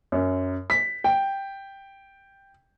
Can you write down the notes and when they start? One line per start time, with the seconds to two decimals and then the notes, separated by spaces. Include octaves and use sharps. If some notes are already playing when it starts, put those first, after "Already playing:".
0.12 F#2
0.70 B6
1.04 G5